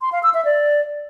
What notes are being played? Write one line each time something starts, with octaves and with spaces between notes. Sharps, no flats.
C6
F5
E6
E5
D5